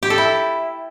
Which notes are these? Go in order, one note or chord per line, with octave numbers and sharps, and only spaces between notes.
G4
A4
E4